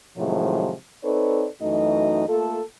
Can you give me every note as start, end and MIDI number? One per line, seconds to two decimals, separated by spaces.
0.17 0.73 45
0.17 0.73 48
0.17 0.73 51
0.17 0.73 53
0.17 0.73 54
0.17 0.73 56
1.04 1.47 60
1.04 1.47 63
1.04 1.47 69
1.04 1.47 71
1.04 1.47 73
1.04 1.47 74
1.61 2.26 42
1.61 2.26 52
1.61 2.26 57
1.61 2.26 63
1.61 2.26 66
1.61 2.26 75
2.29 2.60 57
2.29 2.60 58
2.29 2.60 65
2.29 2.60 69